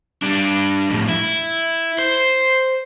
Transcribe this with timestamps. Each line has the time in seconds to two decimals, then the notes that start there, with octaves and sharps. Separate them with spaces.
0.22 G3 D4
0.90 F2 A2
1.08 E4
1.98 C5